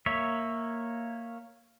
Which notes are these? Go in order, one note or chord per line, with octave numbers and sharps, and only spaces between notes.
A#3 C#5 E5